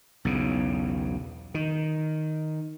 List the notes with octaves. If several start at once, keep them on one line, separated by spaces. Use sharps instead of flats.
B1 E2 C#3
D#3